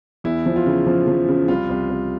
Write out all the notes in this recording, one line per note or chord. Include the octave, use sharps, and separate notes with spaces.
E2 E4
F3
F4
C#3
F3
F3
C#3
C2 F4
C2
C2